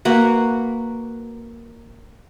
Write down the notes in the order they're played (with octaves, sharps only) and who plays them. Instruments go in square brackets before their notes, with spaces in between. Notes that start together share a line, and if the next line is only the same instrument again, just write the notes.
[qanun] A#3 F#4 B4